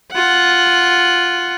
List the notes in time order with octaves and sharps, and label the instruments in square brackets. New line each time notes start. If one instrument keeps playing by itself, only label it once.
[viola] F4 F#5